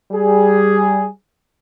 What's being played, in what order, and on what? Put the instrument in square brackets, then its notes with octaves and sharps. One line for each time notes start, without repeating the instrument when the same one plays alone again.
[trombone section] G3 G#4